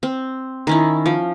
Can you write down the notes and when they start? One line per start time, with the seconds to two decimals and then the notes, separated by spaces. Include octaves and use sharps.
0.03 C4
0.67 D#3 C#4 E4
1.06 F3